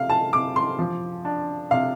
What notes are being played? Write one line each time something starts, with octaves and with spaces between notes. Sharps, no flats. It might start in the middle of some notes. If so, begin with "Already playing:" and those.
Already playing: C3 F5
A5
C3 D6
C6
F3
D4
C3 F5